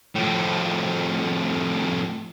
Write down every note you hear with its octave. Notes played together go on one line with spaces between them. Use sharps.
F2 A2